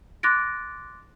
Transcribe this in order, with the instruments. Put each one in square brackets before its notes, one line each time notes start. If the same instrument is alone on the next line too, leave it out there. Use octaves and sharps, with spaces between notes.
[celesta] C6 D6 F#6 A6 A#6 D7